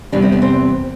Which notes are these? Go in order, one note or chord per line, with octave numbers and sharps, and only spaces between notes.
E2 C3 G3 D4
C4
B3
C4